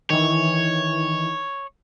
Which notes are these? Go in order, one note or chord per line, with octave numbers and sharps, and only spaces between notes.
D#3 E3 C#5